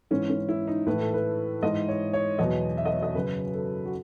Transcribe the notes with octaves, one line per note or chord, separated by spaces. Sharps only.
G#2 E3 C#4
C#4
E4
D#4
A2 E3 B4
A4
B4
G#2 E3 D#5
C#5
C#5
E2 B2 F#3 D#5
E5
D#5
C#5
D#5
F#2 C#3 F#3 B4
A4
F#4